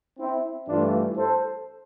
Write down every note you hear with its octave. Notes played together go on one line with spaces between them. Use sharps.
C4 E4
G2 E3 A3 D4 F4
A4 C5